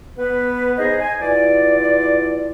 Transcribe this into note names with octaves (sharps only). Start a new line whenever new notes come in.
B3 B4
D#4 G#4 C5 D#5
G#5
E2 F4 D5